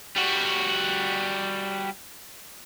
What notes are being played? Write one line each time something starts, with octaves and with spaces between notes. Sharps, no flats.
G3 F#4